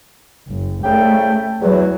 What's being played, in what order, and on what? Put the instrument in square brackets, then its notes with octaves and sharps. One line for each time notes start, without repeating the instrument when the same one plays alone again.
[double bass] F#1
[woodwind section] C2 C#3 G5 [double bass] A3
[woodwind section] E2 [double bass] F#3